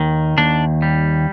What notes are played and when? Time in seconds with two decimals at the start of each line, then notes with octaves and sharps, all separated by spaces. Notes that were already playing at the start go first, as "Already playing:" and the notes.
Already playing: D#2 D#3
0.38 D#2 D4
0.82 G3